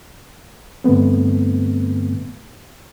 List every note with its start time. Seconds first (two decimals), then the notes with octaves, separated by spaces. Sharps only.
0.84 G2 D3 A3 B3 C4